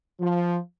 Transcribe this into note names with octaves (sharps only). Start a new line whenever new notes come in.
F3